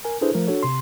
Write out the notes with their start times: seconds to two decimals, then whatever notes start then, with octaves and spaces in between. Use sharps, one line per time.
0.05 A#4 G#5
0.21 D4 E4 G#4 A4 B4 C5
0.34 F3 A3 A#4
0.47 D4 F#4 A4 C#5
0.63 C3 C6